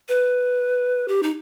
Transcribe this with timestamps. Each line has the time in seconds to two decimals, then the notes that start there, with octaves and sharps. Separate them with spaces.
0.09 B4
1.08 G4
1.23 D#4